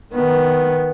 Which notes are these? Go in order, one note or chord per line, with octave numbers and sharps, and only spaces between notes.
D#3 B3